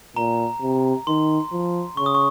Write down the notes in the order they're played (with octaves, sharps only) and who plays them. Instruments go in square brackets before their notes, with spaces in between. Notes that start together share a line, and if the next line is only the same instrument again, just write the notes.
[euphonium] A#2 [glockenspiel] A#5
[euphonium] C3
[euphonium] D#3 [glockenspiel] C6
[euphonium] F3
[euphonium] C#3 [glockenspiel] C#6
[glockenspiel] D#6
C#6